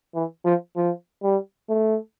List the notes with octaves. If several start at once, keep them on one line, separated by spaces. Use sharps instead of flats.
E3
F3
F3
G3
A3